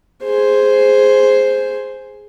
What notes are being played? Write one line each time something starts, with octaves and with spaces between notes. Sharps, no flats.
G#4 C5